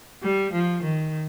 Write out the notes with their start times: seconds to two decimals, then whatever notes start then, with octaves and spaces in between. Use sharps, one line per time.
0.22 G3
0.53 F3
0.83 D#3